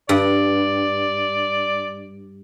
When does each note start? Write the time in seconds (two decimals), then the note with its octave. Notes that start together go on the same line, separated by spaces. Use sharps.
0.09 G2 D5